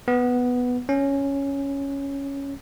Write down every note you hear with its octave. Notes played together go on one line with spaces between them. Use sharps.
B3
C#4